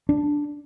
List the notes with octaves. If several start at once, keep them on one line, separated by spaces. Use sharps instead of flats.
D4